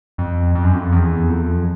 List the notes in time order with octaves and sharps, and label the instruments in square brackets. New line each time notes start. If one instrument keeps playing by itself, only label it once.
[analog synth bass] F2
F2
F#2
F2
E2
F2